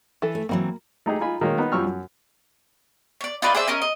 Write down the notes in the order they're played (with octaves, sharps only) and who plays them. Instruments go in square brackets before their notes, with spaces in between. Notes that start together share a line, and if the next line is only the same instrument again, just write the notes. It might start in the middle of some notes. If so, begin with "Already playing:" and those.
[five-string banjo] E3 A4
[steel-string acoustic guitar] A3
[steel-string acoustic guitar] E3 F#3 C4 [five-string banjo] A#3 B5
[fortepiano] A3 D#4 G4 G#4
D#4 F4 G#5 B5
D#3 G#3 A#3 A#4 C#5
B3 D#4
F#2 F3 G3 C#6 E6 F6
F#2
[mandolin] C#5 D5
D#4 F4 B4 D5
G#4 C5 D5 E5
C#4 A#4 D#5
D#5